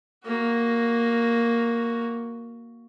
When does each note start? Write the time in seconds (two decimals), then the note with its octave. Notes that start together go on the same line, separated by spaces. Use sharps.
0.25 A#3 F#4